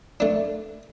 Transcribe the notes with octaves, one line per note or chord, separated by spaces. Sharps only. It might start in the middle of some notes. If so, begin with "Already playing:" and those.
A3 D4